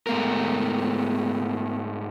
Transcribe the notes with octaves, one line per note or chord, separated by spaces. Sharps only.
G#2 A3 B3 A#4